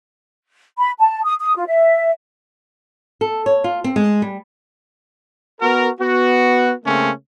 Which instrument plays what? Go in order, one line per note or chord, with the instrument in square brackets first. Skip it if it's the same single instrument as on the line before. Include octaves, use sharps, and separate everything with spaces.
[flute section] B5
A5
D#6
D#6
F4
E5
[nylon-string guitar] A4
C#5
F4
C4
G#3
G3
[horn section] B3 F#4 A#4
B3 F#4
C#3 A3 A#3 C4 C#4